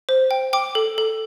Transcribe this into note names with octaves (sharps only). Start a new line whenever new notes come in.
C5
G5
G5 D6
A4
A4